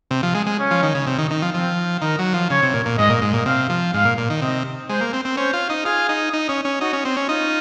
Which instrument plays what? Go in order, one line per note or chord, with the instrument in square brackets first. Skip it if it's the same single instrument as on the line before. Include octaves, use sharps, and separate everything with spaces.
[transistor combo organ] C3
F3
G#3
G#3
[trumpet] C#4
[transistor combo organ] F3
D#3
C#3
C3
D#3
D#3
F3
[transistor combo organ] F3 [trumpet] C4
[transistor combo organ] D#3 [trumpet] A#4
[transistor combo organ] F#3
F3
[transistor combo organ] C#3 [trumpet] C#5
[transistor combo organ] C3
A#2
A#2
[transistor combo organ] G#2 [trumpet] D#5
[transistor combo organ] A#2
G#2
A#2
[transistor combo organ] C3 [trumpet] F5
[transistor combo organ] F3
[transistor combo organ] G#2 [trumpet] F5
[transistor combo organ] A#2
A#2
D#3
[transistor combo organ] C3 [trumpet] D#5
[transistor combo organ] G#3 [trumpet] C5
[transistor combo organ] A#3
C4
C4
[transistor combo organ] C#4 [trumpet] C5
[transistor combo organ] F4
D#4
[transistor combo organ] F4 [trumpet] G#4
[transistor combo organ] D#4
D#4
C#4
C#4
[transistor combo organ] D#4 [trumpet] F#4
[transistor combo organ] C#4
C4
C#4
[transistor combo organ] D#4 [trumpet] F4